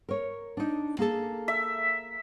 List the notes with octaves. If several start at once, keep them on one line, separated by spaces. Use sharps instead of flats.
A#4 C#5
D4 D#4
A#3 G#4 A4
E5